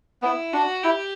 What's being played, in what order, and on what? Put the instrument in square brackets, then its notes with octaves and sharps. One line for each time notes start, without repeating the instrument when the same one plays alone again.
[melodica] B3 [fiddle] E4
[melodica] D4 [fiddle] F#4
[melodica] E4 [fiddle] G4